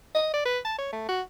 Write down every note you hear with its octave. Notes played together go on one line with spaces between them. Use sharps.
D#5
D5
B4
A5
C#5
A3
F#4